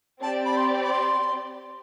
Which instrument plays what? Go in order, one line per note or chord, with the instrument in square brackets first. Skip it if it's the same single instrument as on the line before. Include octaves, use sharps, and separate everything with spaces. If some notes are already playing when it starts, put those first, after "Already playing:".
[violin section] C4 G4 D5 [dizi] A5
[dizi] B5
C6
B5
C6